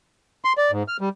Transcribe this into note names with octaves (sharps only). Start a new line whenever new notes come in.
C6
D5
G#2
F6
G3